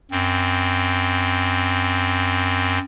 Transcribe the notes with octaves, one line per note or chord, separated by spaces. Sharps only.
F#2 C4